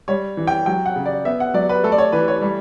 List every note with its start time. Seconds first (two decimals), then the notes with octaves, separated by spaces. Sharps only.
0.08 G3 C#5
0.37 E3
0.47 G5
0.66 F#3 G5
0.86 F#5
0.96 C#3
1.06 D5
1.25 B3 E5
1.40 F#5
1.54 F#3 D5
1.69 B4
1.84 A3 A4
1.92 D5
1.98 C#5
2.12 E3 B4
2.28 C#5
2.41 G3